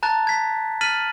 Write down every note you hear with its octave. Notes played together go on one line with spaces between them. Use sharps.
A5 A#5 F#6 A6
G#6 B6
F6 A6 B6 D#7 F#7